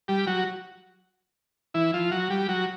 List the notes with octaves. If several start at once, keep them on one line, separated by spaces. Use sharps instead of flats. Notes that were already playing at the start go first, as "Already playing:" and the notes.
G3 G4
F#3 F#4
E3 E4
F3 F4
F#3 F#4
G3 G4
F#3 F#4